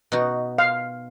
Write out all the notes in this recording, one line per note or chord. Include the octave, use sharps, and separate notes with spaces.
B2 D#4 F#4
F5